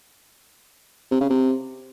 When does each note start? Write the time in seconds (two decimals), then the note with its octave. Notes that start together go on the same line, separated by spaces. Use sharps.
1.11 C3
1.21 C#3
1.30 C3